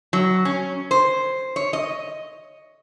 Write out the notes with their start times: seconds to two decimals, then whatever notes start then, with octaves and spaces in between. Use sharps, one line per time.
0.13 F#3
0.45 C#4
0.91 C5
1.56 C#5
1.73 D#5